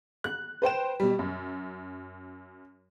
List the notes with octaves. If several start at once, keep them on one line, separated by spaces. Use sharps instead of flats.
F#6
B4 C5 G5 E7
B2 G3
F#2